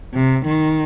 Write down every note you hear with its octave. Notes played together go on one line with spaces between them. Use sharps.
C3
D#3